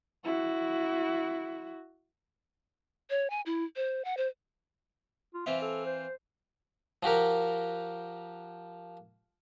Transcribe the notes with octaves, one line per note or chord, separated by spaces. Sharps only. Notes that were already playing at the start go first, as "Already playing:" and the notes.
E4 F#4
C#5
G#5
E4
C5
F#5
C5
F4
E3 C4 F4 E5
A4
C5
F3 F#4 G4 A#4